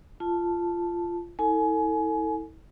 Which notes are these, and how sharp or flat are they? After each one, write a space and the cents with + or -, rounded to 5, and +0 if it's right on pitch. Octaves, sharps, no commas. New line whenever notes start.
F4 -15 A5 +0
E4 -35 A4 +25 G#5 +25